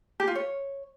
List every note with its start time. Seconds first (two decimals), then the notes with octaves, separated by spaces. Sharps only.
0.20 G4
0.28 F4
0.35 C#5